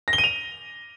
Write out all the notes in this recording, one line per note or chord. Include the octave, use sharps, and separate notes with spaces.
A#6
G7
D#7
F7